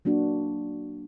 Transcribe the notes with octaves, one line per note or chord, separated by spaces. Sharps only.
F#3 A#3 D4 F#4